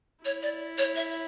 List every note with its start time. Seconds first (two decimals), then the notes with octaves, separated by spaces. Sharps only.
0.25 E4 C#5
0.43 D5
0.78 C#5
0.96 E5